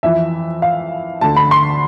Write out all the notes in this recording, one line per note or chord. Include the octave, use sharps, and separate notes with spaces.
F2 E3 E5
F5
D2 D3 A5
B5
C6